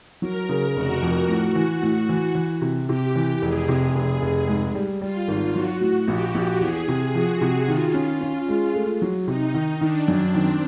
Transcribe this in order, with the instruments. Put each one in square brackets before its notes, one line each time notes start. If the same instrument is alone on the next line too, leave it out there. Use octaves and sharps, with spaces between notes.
[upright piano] F#3 [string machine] A#4
[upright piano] C#3
[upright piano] F1 [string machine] F#4
[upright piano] F2
A2
E3
A2
E3
E3
C3
[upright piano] C3 [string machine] G4
[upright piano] E3
[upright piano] F1 [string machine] G#4
[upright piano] C3
F1
F1
G#2
G3
[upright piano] G3 [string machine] F4
[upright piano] G#1
[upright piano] F#3 [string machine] F#4
[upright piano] A2
[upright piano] A#1 [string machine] G4
[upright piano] A#1
[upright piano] E2 [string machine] G#4
[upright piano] C3
[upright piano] F3 [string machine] F#4
[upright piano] C3
[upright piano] D#3 [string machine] F4
[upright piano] C#4
C#4
G#3
A3
F#3
[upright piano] C3 [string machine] D#4
[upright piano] D#3
[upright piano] D#3 [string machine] D4
[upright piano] F#2
[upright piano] D#3 [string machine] C4